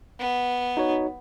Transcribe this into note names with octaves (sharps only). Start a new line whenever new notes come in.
B3
D#4 F#4 C#5